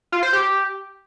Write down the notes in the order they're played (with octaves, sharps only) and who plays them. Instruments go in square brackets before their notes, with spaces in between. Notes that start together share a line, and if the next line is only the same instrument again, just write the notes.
[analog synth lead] F4
C5
G4